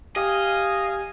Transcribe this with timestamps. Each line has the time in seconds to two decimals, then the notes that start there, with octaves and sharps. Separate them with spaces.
0.16 G4 D#5 F5 G#5